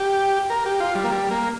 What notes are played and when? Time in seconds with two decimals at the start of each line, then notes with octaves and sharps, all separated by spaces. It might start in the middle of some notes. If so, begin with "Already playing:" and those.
Already playing: G4
0.50 A#4
0.66 G4
0.80 F4
0.95 G3
1.04 A#3
1.11 G3
1.31 A#3